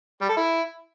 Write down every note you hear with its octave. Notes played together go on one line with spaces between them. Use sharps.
G3
A4
E4